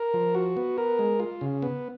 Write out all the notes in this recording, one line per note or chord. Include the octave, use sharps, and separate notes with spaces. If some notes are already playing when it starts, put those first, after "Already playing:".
Already playing: A#4
F3
F#4
B3
A#4
G#3
F4
C#3
B3